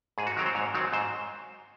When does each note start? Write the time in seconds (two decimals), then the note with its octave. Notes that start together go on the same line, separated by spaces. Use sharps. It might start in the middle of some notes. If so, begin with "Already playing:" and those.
0.18 G#2 G#4
0.27 F#4
0.37 D#3 F#3 C4 A#4
0.46 C5
0.55 G#2 C#5
0.74 D#3 F#3 C4
0.93 G#2 C5